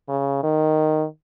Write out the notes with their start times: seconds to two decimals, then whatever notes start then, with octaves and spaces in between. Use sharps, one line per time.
0.08 C#3
0.43 D#3